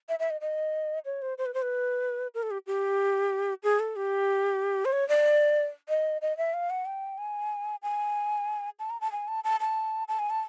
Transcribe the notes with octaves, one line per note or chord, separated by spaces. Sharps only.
E5
E5
D#5
D#5
C#5
C5
C5
B4
C5
B4
A#4
A4
G4
G4
G#4
A4
G4
C5
C#5
D5
D#5
D#5
E5
F5
F#5
G5
G#5
G#5
A5
A#5
A5
G#5
A5
A5
A5
A5
G#5
A5